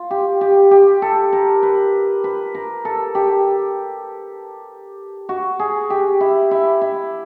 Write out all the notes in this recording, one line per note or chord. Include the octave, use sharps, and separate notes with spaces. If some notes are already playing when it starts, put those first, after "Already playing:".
Already playing: F4
G4
G4
G4
A4
A#4
B4
B4
A#4
A4
G4
F#4
G#4
G4
E4
E4
E4